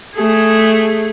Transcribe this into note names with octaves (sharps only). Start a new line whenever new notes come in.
A3 G#4